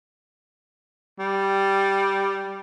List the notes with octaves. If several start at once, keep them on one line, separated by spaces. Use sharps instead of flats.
G3